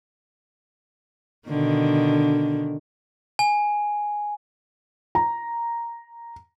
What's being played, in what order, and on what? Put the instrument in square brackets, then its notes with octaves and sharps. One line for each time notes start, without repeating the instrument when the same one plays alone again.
[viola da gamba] B2 D3 D#3
[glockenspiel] G#5
[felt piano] A#5